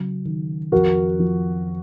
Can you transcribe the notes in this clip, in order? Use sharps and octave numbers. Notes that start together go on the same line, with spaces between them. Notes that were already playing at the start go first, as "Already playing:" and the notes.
Already playing: C#3 F#3
D#3
F2 F#4 A#4
F3